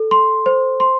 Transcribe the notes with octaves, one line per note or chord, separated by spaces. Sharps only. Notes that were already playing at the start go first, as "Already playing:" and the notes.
Already playing: A4
C6
C5
C6